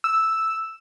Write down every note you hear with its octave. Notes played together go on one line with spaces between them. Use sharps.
E6